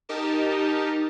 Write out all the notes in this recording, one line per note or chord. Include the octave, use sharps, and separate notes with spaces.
D#4 G4 A#4 A5